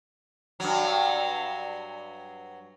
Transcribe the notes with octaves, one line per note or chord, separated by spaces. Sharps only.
G2 F#3